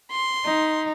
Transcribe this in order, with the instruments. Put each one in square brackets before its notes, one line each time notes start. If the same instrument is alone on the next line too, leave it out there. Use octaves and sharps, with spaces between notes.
[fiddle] C6
[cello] D#4